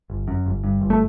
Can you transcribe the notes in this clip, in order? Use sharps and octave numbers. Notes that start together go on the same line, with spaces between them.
G1
F#2
G1
G2
G1
A3